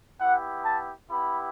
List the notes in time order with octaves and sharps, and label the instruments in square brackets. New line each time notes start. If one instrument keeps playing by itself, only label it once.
[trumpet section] B3 E4 G4 F#5
A5
B3 E4 G4 B5